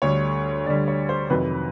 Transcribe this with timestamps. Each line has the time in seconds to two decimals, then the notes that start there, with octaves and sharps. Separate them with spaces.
0.02 D2 D3 G3 C#5
0.66 D2 D3 G3 D5
0.88 C#5
1.09 C5
1.30 F2 C3 D#3 F#3 B4